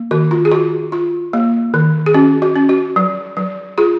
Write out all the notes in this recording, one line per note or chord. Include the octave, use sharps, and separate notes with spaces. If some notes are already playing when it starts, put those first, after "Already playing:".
Already playing: A#3
D#3 F#4
F4
G#4
F4 F#4
F4
A#3
D#3
G#4
C#4 F#4
F#4
C#4
F#4
F#3
F#3
F4 G#4